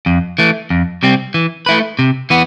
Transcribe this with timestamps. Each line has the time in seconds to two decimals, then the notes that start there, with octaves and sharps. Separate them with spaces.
0.06 F2
0.38 E3 A3
0.70 F2
1.03 C3 G3 C4
1.34 E3
1.66 A3 E4 B4
1.99 C3
2.30 E3 B3